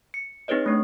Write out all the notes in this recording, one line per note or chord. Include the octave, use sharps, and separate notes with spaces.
C#7
C4 D#4 G#4 B4 C#5 D#5
A3 D4 C#6